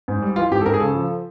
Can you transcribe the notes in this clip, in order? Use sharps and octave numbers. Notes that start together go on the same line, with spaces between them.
G#2
G3
E3 F4
G#2 G4
A4
G#2 A#4
G#4
C#3 A4
F3